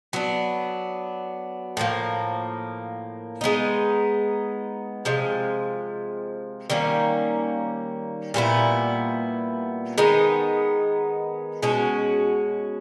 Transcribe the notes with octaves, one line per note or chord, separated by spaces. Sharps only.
F#3 B3 D4
A2 F3 A#3
G#3 B3 D#4
C3 F3 G#3
D#3 G3 A#3 C#4
A#2 G3 B3 E4
D#3 G#3 B3 D#4
B2 G#3 C#4 F#4